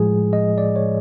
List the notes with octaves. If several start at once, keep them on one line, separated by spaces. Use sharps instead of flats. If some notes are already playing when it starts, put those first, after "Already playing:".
Already playing: A2 F3 G#3 G#4
D#5
D5
C#5